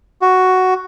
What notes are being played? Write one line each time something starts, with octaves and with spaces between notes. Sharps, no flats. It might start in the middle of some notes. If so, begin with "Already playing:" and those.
F#4